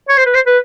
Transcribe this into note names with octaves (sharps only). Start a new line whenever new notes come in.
C#5
C5
B4
C5
B4